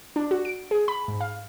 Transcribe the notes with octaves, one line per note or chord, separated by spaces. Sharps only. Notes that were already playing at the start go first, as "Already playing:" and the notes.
D4
F#4
D7
G#4
B5
G#2
F5